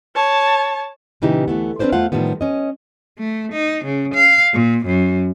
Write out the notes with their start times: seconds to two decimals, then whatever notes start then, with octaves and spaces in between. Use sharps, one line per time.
0.15 C#5 A5
1.22 A#2 C#3 E3 D#4 G4
1.48 D2 E3 A3 B3
1.79 C4 D4 F#4 B4 C5 D5
1.92 E2 A3 F4 C5 F5 F#5
2.12 A2 D#3 F3 G3 B3
2.41 C#4 D#5
3.19 A3
3.53 D#4
3.85 C#3
4.14 F5
4.53 A#2
4.86 F#2